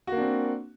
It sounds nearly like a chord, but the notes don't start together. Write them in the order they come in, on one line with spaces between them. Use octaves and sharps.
F#4 A#3 D4 C4